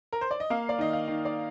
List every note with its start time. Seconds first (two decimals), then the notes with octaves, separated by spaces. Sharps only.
0.13 A#4
0.21 C5
0.31 D5
0.40 D#5
0.50 A#3 F5
0.69 D5
0.79 D#3 D#5
0.93 F5
1.08 D#3
1.25 D5